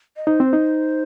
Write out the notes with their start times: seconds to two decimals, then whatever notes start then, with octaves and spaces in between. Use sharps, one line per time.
0.16 D#5
0.27 D#4 C5
0.40 C4
0.53 D#4